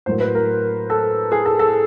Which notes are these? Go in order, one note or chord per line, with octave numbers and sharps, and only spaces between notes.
A2 F#3 A#3 C5
B4
A#4
A4
G#4
A4
A4